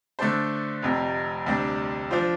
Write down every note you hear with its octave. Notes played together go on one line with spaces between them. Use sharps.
D3 A3 D4 A4 C5
F1 F2 C3
D2 C3 G3 D4
F3 D4 F4 C5